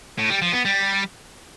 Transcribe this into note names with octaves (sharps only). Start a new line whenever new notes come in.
A2
G3
F3
B3
G3